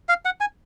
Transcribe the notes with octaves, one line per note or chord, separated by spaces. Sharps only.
F5
F#5
G#5